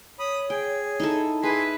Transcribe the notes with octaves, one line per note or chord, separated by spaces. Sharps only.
C#5 B5 D#6
G#4 G5
D#4 E4 A4
E4 G#4 B4 G#5 C6